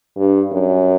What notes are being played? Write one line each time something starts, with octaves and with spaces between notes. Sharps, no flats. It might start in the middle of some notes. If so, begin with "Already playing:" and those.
G2
F#2